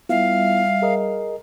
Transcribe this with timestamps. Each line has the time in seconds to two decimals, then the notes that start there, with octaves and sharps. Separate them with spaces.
0.09 G3 B3 E4 F4 E5 F5
0.82 G#4 A#4 D#5